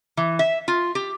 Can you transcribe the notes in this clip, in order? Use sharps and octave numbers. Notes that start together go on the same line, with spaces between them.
E3
E5
F4
G4